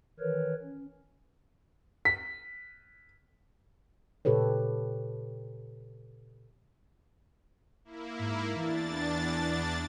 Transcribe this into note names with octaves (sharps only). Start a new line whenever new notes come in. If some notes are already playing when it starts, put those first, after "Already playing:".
D#3 E3 A#4 B4 C#5
C#4
B6
A#2 C#3 G4 A4 B4 C#5
A#3 E4
G#2
E2 E3 D4 A6